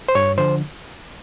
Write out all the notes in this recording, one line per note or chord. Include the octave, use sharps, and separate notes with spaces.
C5
G2 C#5
D3 F3 C5